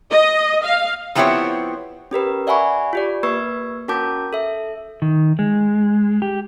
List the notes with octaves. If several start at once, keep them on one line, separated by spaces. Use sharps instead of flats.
D#5
F5
F3 B3 C4 E4 G4 C#5
C#4 G4 A#4 B4
D5 E5 F#5 G#5 B5 C#6
F4 G4 D5
A#3 B4 C#6 E6 G#6
C#4 F#4 A#4 A5 D6 G6
A4 E5
D#3
G#3
G4